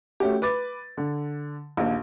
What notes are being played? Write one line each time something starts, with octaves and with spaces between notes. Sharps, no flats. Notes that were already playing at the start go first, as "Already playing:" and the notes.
A3 C#4 F#4 G4
B4 D6 A6
D3
A#1 D#2